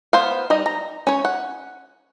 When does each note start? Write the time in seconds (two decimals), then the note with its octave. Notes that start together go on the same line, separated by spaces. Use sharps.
0.13 B3 C5 F5
0.50 G3 D#4 D#5
0.66 A#5
1.07 C#4 C#5
1.25 F#5